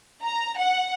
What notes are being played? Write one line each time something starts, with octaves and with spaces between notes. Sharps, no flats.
A#5
F#5